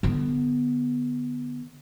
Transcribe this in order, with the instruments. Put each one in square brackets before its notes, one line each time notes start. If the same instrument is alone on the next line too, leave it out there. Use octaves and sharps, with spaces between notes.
[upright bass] D3 B3